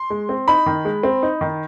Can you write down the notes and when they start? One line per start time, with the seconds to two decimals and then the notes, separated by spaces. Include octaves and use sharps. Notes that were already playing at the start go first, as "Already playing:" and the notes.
Already playing: C6
0.10 G#3
0.29 C4
0.48 D#4 B5
0.66 D#3
0.85 G#3
1.03 C4
1.23 D#4
1.41 D#3